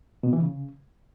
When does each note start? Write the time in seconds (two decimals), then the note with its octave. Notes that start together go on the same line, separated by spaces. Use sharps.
0.23 B2
0.33 E3
0.42 C#3